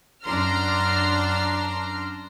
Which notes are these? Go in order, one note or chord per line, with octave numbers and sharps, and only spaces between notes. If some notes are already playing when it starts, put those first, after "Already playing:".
F#2 D4 A#5 C6 F6